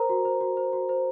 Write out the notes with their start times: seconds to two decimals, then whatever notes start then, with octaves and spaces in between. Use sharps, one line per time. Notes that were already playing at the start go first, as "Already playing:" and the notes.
Already playing: A#4 C5 A#5
0.09 F#4
0.25 C5
0.41 F#4
0.57 C5
0.73 F#4
0.89 C5